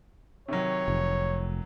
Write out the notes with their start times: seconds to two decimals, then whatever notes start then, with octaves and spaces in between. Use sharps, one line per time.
0.48 C3 D#3 F#3 C#5
0.88 F1